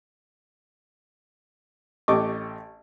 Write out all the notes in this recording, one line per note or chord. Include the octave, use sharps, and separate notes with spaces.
A1 A3 G4 D#5 C#6 D6